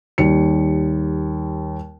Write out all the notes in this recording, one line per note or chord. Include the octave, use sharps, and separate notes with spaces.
D#2 G3 C#7